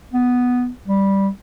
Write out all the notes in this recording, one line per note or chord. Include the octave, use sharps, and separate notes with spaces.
B3
G3